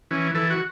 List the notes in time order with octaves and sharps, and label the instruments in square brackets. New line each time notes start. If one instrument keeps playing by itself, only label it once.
[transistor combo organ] E3 C#4
E3 A4
F#4